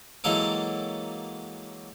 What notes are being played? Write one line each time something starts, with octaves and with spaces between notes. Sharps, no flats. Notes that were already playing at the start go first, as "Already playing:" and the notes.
E3 F#3 G#3 A#3 A4 A#4